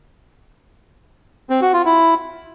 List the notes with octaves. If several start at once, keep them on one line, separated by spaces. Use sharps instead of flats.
C4
F#4
F4
E4